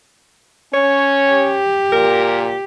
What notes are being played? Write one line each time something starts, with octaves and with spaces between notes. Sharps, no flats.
C#4 C#5
G4
A#2 A#4